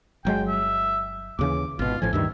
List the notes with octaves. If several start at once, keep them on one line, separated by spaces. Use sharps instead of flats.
G1 F#3 G#3 G5
E5
D#2 C#3 E3 D6
G#1 B2 F4
A1 A2 F3 G#5
D2 G2 D#3 E5